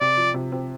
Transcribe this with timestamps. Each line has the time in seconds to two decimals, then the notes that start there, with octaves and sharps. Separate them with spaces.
0.01 C3 D5
0.17 F3
0.34 C3
0.52 C4